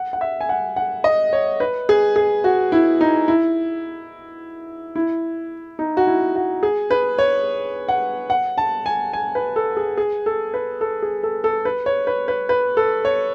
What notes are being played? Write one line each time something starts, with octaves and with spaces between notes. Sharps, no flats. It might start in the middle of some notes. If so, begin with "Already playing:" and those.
Already playing: F#5
F#5
E5
G#5
F#5
F#5
D#5
C#5
B4
G#4
G#4
F#4
E4
D#4
E4
E4
D#4
F#4
E4
F#4
G#4
B4
C#5
F#5
F#5
A5
G#5
G#5
B4
A4
G#4
G#4
A4
B4
A4
G#4
A4
A4
B4
C#5
B4
B4
B4
A4
C#5